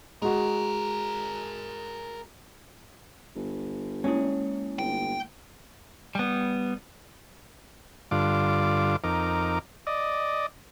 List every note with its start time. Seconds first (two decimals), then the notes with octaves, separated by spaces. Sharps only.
0.22 G#3 F#4 G#4 A#4
3.36 G1
4.04 G#3 A#3 C#4 E4
4.79 G1 G5
6.15 G3 B3
8.11 G2 D3 F4 D6
9.04 F2 D#4 A#4 D6
9.87 D5 D#5